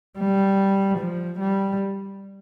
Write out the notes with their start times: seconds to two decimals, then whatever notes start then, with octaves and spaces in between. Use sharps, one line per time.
0.19 G3
0.99 F3
1.40 G3